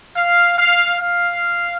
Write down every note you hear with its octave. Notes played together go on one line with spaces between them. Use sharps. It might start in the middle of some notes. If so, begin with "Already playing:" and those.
F5
F5
F5